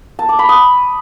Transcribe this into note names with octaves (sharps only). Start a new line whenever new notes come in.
A5
D6
B5
D#6